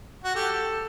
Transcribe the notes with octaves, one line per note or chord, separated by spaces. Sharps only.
F#4
G4 A4